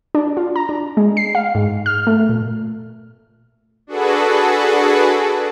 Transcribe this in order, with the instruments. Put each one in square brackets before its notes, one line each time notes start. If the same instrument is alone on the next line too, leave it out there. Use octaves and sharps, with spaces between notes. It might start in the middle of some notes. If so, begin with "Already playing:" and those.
[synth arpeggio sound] D4
F4
A#5
D4
G#3
C7
F5
G#2
F6
A3
A#2
[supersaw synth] D4 F#4 G#4 A4 B4